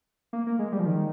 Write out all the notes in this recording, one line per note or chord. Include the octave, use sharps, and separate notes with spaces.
A#3
A#3
G#3
G3
F3
D#3